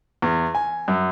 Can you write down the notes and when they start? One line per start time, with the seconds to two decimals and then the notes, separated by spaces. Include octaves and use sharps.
0.22 E2
0.55 G#5
0.88 F#2